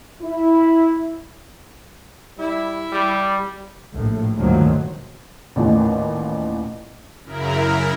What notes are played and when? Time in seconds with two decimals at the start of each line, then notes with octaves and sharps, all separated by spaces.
0.22 E4
2.38 G3 E4
2.93 G3
3.94 A#1 A2
4.38 D2 G2 A#2 D#3 F3 F#3
5.56 A1 D#2 A#2 E3
7.25 F#2 C#3 E4 A#4